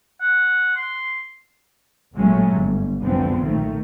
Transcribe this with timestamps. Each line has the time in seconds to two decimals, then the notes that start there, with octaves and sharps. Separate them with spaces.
0.21 F#5
0.76 C6
2.15 A1 A#2 F#3 G#3 A3 C#4
2.50 G1
3.01 C#2 F#2 D3 F3 B3 C4
3.42 B1 A#2 D#3 A3